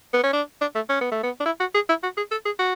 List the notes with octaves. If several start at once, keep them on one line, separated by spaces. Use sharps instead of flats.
B3
C#4
D4
D4
A3
C#4
B3
A3
B3
D4
E4
F#4
G#4
E4
F#4
G#4
A4
G#4
F#4